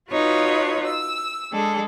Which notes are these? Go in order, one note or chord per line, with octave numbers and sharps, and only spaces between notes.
D#4 F4 F#4 B4 C#5
E6
G#3 D4 G#4 A4